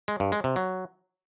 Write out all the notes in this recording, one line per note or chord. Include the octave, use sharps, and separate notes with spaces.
G#3
G2
G#3
C3
F#3